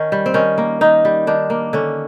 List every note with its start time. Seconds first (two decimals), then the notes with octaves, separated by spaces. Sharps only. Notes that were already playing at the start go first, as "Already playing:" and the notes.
Already playing: D#3 C#4
0.12 G3
0.26 C4
0.34 D#3 C#4
0.58 A#3
0.81 D#3 D#4
1.05 G3
1.27 D#3 D4
1.50 A#3
1.73 D3 C#4